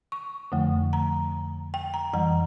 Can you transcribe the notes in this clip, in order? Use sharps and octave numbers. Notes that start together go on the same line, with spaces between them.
C#6
F2 D3 F3 A3
A#5
G5
A#5
F2 E3 G3 A#5